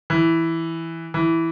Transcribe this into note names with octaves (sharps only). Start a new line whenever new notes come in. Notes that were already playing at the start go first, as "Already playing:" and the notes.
E3
E3